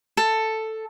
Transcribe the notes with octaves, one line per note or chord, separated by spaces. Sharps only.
A4